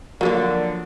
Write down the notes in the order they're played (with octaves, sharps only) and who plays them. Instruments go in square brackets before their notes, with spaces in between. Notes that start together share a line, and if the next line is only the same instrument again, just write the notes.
[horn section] D3 [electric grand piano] F3 [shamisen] F#3 G#3 A#3 [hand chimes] A#4